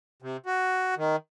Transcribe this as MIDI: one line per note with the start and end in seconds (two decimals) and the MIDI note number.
0.22 0.37 48
0.46 0.95 66
0.97 1.16 51